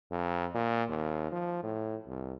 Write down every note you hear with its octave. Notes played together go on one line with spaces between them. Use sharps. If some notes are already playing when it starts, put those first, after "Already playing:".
F2
A#2
D#2
F3
A2
C2